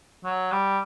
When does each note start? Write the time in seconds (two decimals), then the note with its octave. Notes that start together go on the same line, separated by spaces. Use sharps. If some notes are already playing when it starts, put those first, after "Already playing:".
0.24 F#3
0.52 G3